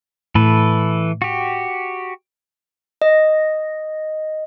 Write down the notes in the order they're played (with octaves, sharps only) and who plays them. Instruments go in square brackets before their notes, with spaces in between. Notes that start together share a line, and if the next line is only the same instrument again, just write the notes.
[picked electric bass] A2 [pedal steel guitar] E3 A4 B4
[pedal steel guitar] F#4 G4
[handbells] D#5